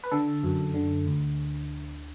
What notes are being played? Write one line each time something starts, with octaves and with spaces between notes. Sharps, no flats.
B4
D3 A4
F#2
D3
D2